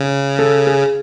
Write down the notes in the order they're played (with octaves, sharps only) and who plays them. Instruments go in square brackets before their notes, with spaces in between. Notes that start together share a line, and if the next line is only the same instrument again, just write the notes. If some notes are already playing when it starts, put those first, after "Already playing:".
Already playing: [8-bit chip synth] C#3
[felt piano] A4
G#4